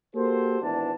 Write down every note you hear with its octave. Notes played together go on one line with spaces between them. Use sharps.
A#3 F#4 G4 A4 C5
G#1 E3 B3 D4 A5